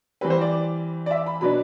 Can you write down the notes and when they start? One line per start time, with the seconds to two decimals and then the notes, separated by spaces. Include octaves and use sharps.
0.21 E3 G3 C4 B4
0.30 C5
0.41 D5
1.06 D5
1.11 E5
1.26 B5
1.41 B2 F#3 B3 D4 B5